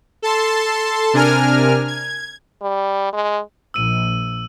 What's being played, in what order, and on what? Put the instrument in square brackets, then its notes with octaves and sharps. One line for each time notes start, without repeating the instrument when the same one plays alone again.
[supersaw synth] A4 A5 C6
C3 D4 A#4 G#5 F6
G#6
[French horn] G3
G#3
[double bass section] A#1 [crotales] E6 D#7